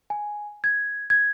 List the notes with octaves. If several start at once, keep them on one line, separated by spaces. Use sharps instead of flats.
G#5
G#6
G#6